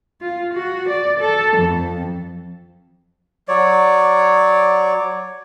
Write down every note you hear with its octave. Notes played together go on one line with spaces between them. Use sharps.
F4
F#4
D5
A4
F2
F#3 C#5 D5